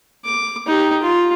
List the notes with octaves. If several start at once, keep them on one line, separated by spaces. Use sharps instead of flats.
D6
D#4 G4
F4